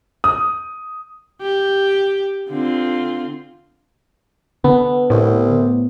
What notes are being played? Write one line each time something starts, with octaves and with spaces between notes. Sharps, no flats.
D#6
G4
D3 C4 F4
D3 B3
C2 A2